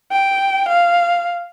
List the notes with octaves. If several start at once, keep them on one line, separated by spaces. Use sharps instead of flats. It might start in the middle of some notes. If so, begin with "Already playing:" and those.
G5
F5